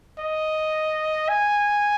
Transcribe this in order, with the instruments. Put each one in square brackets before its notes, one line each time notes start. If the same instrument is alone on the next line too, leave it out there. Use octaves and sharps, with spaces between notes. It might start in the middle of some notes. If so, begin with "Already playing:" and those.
[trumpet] D#5
G#5